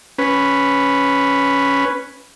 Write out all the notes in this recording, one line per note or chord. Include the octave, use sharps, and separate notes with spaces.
C#4 B4